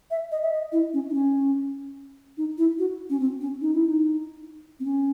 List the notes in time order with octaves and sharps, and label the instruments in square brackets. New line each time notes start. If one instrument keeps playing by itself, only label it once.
[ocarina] E5
D#5
E5
D#5
E4
C#4
D#4
C#4
D#4
E4
F#4
C#4
C4
C#4
D#4
E4
D#4
C4
C#4